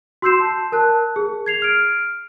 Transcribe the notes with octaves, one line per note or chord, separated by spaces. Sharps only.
F#4 C6 E6 G6 C7 E7
A5
A#4 A5 F#6
G#4
G#6 C7 F7
F6 D7